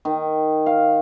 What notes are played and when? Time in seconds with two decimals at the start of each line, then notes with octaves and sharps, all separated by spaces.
0.05 D#3
0.66 F5